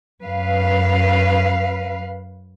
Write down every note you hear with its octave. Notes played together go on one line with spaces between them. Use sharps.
F#2 B4 F5